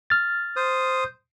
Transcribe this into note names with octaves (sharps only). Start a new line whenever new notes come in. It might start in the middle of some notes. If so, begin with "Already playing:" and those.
F6 A6
C5 D#6